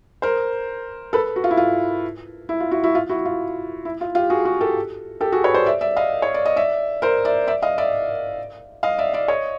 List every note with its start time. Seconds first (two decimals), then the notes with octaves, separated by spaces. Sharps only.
0.22 A#4 C5
1.13 A4 B4
1.36 F#4
1.44 F4
1.51 E4
1.57 F4
2.49 E4
2.60 F4
2.71 E4 F#4
2.84 E4 F#4
2.95 F4
3.09 E4 F#4
3.25 F4
3.85 E4
4.01 F4
4.15 F4 G4
4.30 F#4 G#4
4.45 F#4 G#4
4.61 G4 A4
5.21 G4 A4
5.32 F#4 G#4
5.44 B4 C#5
5.54 C5 D5
5.66 D5 E5
5.81 D5 E5
5.96 D#5 F5
6.22 C#5
6.34 D5
6.46 D#5
6.56 D5 E5
7.02 A#4 C5
7.25 D5 E5
7.47 D5 E5
7.62 D#5 F5
7.78 D5 E5
8.83 D#5 F5
8.98 D5 E5
9.13 D5 E5
9.28 C#5 D#5